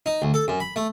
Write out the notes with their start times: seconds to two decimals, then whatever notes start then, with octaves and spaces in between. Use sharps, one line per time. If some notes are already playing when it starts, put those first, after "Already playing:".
0.06 D#4
0.22 D2
0.34 A4
0.48 F#2
0.60 B5
0.76 A3